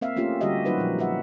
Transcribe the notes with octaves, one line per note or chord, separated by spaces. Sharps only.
A#3 C4 E5 F5
A3 A#3 C#4 F4 G4 A#4
D3 G3 F#4 G4 D#5 E5
F#3 A#3 D#4 F#4 B4 C5
A#2 F3
F#4 B4 E5 F#5